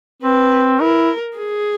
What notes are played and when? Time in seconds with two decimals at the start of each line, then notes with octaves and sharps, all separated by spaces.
0.23 C4 B4
0.80 E4 A#4
1.38 G#4